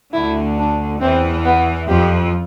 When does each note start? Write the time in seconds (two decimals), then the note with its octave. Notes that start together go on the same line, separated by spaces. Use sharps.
0.13 D2 D3 E4
0.58 D4
1.01 E2 E3 C4
1.45 B3
1.88 F2 F3 G4